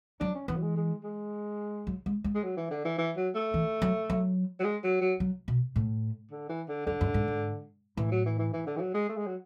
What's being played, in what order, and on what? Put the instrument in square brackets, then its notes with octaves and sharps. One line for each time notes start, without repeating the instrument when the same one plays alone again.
[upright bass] F#3 [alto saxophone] D4
[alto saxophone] C#4
[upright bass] E3 [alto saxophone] B3
[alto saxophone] F#3
G#3
G#3
G#3
[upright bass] F#3
G#3
G#3
[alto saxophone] G#3
F#3
E3
D3
E3
E3
F#3
A3
[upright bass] E3
F#3
F#3
[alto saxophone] F#3
G#3
F#3
F#3
[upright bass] F#3
B2
A2
[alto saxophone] D3
E3
D3
[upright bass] F#2 [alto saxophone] D3
[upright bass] F#2
G#2
G#2
[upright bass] A2 [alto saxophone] E3
[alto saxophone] F#3
E3
E3
E3
D3
E3
F#3
G#3
A3
G#3
F#3